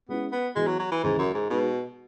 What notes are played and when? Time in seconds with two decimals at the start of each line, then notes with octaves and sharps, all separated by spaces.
0.09 G#3 B3 C#4 E4
0.32 B3
0.56 E3 G#3 B3 F#4
0.67 F#3
0.79 F#3
0.91 E3
1.03 D#2 G#2 C#3 E3
1.18 F#2
1.34 G#2
1.50 B2 G#3 D#4 G#4 B4